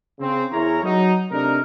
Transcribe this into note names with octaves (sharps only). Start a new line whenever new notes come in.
C#3 C4
E2 E4 G#4 A#4 C#5 A#5
F#3 D#4
C3 A3 D4 D#4 A#4